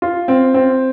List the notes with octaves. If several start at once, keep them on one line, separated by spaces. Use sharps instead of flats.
F4
C4
C4